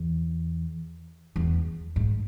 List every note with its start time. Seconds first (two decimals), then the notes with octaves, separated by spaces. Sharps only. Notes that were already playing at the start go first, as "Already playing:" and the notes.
Already playing: E2
1.36 E2
1.96 G#2